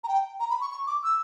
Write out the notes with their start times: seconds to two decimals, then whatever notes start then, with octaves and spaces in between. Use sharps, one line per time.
0.04 A#5
0.08 G5
0.40 A#5
0.50 B5
0.61 C#6
0.72 C#6
0.87 D6
1.04 E6